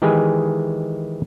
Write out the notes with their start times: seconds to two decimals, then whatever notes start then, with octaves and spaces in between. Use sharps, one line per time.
0.02 D#3 E3 G#3 G4 G#4 G#5